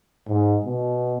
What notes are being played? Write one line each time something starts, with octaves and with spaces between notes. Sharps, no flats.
G#2
B2